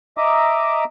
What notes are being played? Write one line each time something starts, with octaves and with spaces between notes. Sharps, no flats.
D#5 E5 A#5 D6 D#6